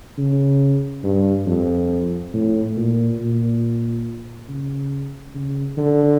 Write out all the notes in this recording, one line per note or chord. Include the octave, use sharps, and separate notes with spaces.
C#3
G2
F2
A2
A#2
A#2
C#3
C#3
D3